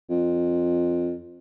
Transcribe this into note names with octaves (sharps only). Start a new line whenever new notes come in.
F2